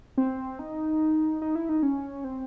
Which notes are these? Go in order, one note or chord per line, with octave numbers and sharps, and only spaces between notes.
C4
D#4
D#4
E4
D#4
C#4
C4